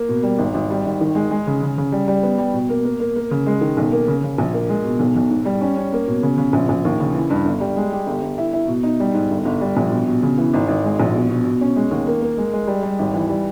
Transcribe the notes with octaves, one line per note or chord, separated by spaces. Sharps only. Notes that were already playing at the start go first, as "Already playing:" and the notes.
Already playing: A#3
B2
G3
G#1
G#1
G3
G#1
D#3
G#3
G#3
C#3
C#3
C#3
G3
G3
B3
G3
B2
A#3
A#3
A#3
A#3
C#3
G#3
D#3
B1
A#3
C#3
C#3
A#1
A#3
G#3
B2
B1
B1
G#2
G3
C#4
C#4
A#3
B2
C#3
C#3
A#1
A#1
D#2
C#3
E3
G2
G1
G3
G#3
G4
G1
G1
E4
E4
B2
D#4
G3
G#2
G1
G1
G3
A#1
B2
B2
C#3
E3
G#1
G#1
G#3
A#1
B2
B2
B2
C#4
G#3
D#2
A#3
A#3
G#3
G#3
G3
G3
G#1
E3
G3